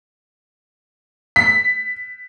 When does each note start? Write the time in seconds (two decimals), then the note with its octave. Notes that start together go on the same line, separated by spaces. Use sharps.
1.36 B6